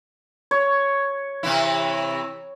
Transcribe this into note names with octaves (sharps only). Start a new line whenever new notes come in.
C#5
C3 E3 E4